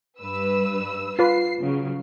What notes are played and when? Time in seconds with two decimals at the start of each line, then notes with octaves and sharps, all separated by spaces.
0.20 G2 B4 E6
1.19 F4 B4 C7
1.61 C#3 F#3